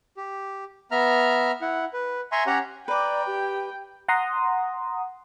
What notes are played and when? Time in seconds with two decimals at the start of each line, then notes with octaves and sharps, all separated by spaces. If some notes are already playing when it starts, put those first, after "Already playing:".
0.17 G4
0.91 B3 E5 A#5 F6
1.61 E4 F#5
1.93 B4
2.32 E5 G#5 A#5 C6 C#6
2.46 C#4 G4 C#5 F#5 A#5
2.88 B4 D5 G5 A#5 D6
3.27 G4
4.08 F#5 A#5 C6 D#6